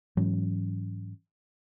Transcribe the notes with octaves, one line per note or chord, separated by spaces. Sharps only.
G#2 E3 F#3 C#4